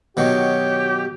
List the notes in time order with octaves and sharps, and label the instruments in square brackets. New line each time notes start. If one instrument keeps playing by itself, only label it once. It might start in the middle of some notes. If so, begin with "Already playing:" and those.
[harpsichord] B2 D#3 F#3 [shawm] G4 [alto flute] C#5